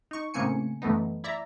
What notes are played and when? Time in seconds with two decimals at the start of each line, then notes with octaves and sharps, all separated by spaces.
0.11 D#4 C#6
0.34 A2 C#3 A#3 C4 G#5 C#7
0.82 F#2 E3 A3 B3 D#4
1.24 E4 D5 E5 A#5